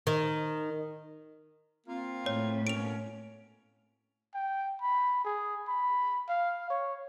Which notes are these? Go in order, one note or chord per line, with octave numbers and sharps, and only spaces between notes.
D#3
A#3 C4 F4
A2 C#5
B2 A#3 C#4 D7 F7
G5
B5
G#4
B5
F5
C#5